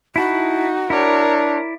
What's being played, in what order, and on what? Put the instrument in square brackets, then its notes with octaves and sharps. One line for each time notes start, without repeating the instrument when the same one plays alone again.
[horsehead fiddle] D#4 [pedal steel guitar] E4 A5 B5 [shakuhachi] F#4
[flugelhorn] D4 [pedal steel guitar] E4 D5 [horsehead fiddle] A#4 C#5